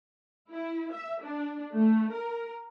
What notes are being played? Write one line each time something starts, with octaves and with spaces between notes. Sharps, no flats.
E4
E5
D4
A3
A#4